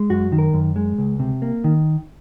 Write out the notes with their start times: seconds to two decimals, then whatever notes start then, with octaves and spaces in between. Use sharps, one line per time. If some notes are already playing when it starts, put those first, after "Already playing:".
Already playing: G#3
0.10 F#2 F#4
0.32 D#3
0.39 A#4
0.54 F#2
0.76 G#3
0.98 C#2
1.19 C3
1.42 A#3
1.64 D#3